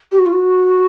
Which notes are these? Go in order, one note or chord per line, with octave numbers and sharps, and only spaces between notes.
G4
F#4
F4
F#4